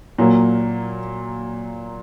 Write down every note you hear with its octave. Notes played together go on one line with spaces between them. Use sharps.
A#2 F#3 A#3